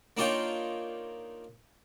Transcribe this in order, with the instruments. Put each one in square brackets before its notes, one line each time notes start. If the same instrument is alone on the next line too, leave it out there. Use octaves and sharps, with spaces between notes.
[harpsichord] A#3 D4 D#4 F4 C#5 G5